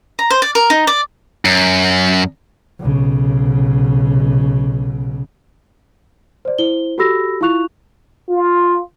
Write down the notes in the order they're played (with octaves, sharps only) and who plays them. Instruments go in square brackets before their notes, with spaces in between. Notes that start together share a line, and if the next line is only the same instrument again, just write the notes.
[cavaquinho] A#5
C5
D5
A#4
D#4
D5
[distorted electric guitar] F#2
[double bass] B1 C#3
[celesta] C5 D5
E4 C5 G7
F#4 G4 A4 B5 E6 A#6
E4 F4 F5 C#6 F#6 F7
[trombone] F4